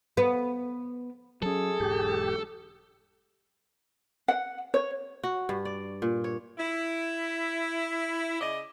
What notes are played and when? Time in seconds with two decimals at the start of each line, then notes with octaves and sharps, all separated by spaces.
0.17 B3
1.43 F#3 C#4 G#4 A4
1.80 E1 G#2 G4
4.28 F#5
4.74 C#5
5.23 F#4
5.49 G2
5.65 D5
6.02 A#2
6.24 C#5
6.58 E4
8.40 C#3 D5 D#5